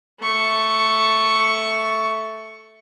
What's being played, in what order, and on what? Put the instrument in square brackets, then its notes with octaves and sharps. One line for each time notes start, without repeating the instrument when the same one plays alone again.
[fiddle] A3 C#6